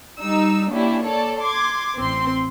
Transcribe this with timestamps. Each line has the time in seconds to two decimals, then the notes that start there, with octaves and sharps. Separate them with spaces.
0.22 G3 D#4 E6
0.71 A#3 C#4 D4 E4 G4
1.03 A4 C#5 D5 A5
1.41 C6 D6 G#6
1.97 A1 C4 C6